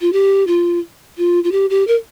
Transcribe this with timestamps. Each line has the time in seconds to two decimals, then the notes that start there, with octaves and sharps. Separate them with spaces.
0.01 F4
0.13 G4
0.47 F4
1.18 F4
1.44 F4
1.52 G4
1.70 G4
1.87 A#4